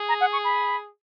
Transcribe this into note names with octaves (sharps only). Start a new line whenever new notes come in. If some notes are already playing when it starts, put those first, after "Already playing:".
Already playing: G#4
A#5
F#5
C#6
B5